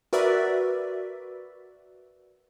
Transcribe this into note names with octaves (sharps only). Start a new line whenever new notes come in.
F#4 A#4 B4 D5 E5